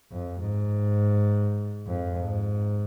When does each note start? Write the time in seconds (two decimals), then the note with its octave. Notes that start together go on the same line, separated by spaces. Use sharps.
0.11 F2
0.40 G#2
1.86 F2
2.17 G#2